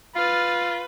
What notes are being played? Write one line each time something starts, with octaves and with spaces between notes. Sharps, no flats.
F4 B4 F6 A6